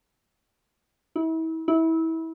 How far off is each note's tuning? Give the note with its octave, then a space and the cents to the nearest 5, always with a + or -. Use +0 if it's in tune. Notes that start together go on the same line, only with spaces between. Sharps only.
E4 -35
E4 -25